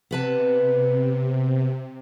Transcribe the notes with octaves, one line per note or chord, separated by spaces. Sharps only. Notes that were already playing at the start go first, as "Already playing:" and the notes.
C3 B3 B4 A5